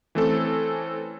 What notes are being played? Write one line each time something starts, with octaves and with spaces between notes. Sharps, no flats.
E3 A3 C4 C#4 A4